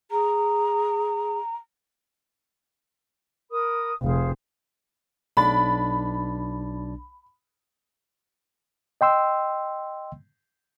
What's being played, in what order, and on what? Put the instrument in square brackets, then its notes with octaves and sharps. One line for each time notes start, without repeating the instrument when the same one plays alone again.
[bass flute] G#4 [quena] A#5
[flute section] A#4 B5 D#6
[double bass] F1 [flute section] G#4 C5 F5
[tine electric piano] B1 D4 A6 [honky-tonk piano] B5
[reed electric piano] D#5 G5 C6 E6